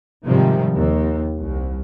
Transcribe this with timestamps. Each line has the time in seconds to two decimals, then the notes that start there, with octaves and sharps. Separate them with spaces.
0.24 G#2 C3 D#3 F3 G3
0.75 D#2
1.40 C2